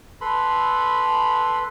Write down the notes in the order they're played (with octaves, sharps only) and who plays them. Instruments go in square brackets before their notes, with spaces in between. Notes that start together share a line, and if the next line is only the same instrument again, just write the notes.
[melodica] A4 B4 B5 C6